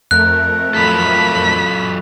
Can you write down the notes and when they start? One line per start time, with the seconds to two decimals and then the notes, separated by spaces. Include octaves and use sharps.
0.11 F2 A3 A#4 F#6
0.74 F#3 F4 A4 B5 B6